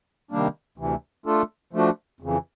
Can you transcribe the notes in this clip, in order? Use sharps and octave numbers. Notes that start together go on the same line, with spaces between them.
C3 D#3 G3 A#3 D4
D2 C3 E3
A3 D4 F4 A4
F3 A3 D4 F#4
F2 C#3 E3